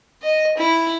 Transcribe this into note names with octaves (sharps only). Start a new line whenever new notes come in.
D#5
E4